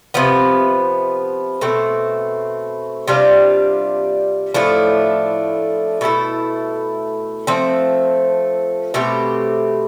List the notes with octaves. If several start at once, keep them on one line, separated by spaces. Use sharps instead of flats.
C3 F3 B3
B2 A3 C4
C3 G3 D4 F4
A2 F3 A3 D4
B2 A3 E4 A4
F3 A3 C4
B2 A3 C4 G4